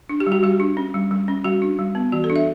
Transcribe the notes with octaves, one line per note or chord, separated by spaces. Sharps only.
D4
G4
G3
F#4
G3 G4
D4
C#4
G3
G3
C#4
G3 F#4
D4
G3
B3
E3 F#4
A4
D4
E5